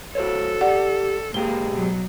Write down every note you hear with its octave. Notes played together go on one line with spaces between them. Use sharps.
F#4 A4 C5 C#5
G4 D5 F#5
G#2 A#3 G4 G#4 G7
B2 F#3